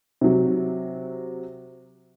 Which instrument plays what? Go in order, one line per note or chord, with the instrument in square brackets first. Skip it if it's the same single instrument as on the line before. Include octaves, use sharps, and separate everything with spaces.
[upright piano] C3 F#3